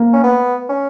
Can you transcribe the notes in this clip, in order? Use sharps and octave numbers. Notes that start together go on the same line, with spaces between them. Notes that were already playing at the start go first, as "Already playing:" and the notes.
Already playing: A#3
C#4
B3
C#4